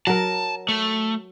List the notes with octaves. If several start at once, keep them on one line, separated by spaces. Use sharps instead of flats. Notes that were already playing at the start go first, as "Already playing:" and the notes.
F#3 A#4 A5
A3